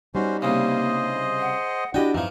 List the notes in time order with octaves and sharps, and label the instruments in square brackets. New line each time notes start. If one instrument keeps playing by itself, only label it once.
[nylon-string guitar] G3 B3 D#4 [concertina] C#4 F#4 C5
[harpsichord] C2 C#3 [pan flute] A#3 [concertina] G#4 C5 D#5
[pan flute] F#5
[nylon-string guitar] D4 F#4 G4 [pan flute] E4 [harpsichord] D#5 G5
[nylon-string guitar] F2 G#2 [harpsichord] E3 F3 [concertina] D#4